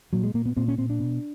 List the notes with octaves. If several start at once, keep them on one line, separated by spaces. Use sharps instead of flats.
A#2 F#3
G#3
A#2 A#3
B3
A#2 C4
C#4
A#2 C4
D4
B2